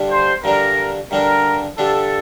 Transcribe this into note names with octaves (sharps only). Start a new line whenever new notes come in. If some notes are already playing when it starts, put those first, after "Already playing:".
Already playing: G2 D3 G3 D4
C5
G2 D3 G3 D4 A#4
G2 D3 G3 D4 A#4
G2 D3 G3 D4 A4